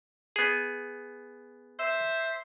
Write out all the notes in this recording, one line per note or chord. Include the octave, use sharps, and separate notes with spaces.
B3 G#4
C5 E5